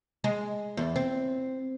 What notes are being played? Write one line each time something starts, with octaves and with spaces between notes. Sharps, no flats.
G#3
E2
C4